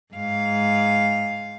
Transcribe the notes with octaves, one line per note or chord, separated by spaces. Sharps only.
G#2 F5